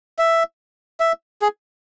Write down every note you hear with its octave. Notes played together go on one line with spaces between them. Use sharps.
E5
E5
G#4